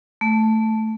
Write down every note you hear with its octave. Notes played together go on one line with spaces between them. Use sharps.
A3